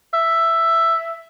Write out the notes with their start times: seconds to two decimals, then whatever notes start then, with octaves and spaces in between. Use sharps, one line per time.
0.14 E5